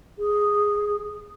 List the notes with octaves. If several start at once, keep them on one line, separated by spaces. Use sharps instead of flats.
G#4